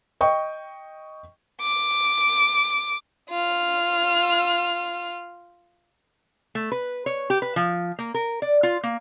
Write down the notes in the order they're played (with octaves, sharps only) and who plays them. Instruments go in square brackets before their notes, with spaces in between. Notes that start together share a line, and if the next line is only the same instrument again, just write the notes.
[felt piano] D#5 G5 C#6
[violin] D6
F4 F6
[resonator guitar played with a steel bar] A3
B4
C#5
G4
B4
F3
A#3
A#4
D5
F4
A#3